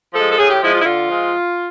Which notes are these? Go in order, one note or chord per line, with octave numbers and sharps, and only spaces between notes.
F3 G#3 A4
A4
A2 G#4
G4
F3 G#3 E4
F4
E4
D3 F4
F3 G#3